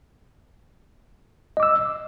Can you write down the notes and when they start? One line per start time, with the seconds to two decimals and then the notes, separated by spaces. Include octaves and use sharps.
1.57 D#5
1.60 D6
1.63 E6